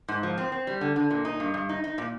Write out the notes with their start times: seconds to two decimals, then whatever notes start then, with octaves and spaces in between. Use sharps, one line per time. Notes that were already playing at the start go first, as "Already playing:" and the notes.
0.08 G#2
0.23 F3
0.38 C4
0.52 C4
0.67 G3
0.81 D3
0.96 D3
1.11 A#2
1.25 D#4
1.40 G2
1.54 G2
1.69 D#4
1.84 D#4
1.98 A#2